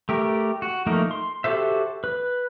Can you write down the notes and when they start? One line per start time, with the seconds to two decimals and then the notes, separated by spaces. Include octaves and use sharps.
0.09 A3 G4 A#4
0.62 F#4
0.86 F3 A3 A#3 D#4 A#4
1.11 C6
1.44 F#4 G4 A4 C5 E5
2.04 B4